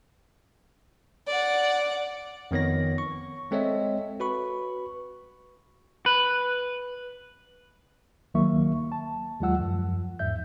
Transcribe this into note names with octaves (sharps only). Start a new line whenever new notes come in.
D5 F#5
F2 D#3 B3 C#5 A#6
C#6
G#3 C4 A4 C#5 D#5 E5
F#4 B4 B5 C#6
B4
C#2 D#3 F#3 A#3 E5 C#6
A5
D#2 F#3 G#3 F4 F#5 E6
F#2 F3
E2 G#2 E5 G6